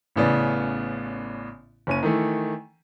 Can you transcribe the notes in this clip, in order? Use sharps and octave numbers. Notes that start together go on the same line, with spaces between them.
A1 A2 C#3 B3 D5
F#1 C#4 D#7
D#3 E3 A3